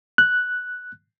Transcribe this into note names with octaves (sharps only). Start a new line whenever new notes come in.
F#6